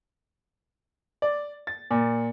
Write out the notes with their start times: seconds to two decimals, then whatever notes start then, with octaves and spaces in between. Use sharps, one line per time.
1.22 D5
1.67 A6
1.91 A#2